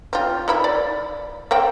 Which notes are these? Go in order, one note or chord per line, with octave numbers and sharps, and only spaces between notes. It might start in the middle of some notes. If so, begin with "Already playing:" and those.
C4 F4
D#3 E4 B5
D5
A#3 C4 G5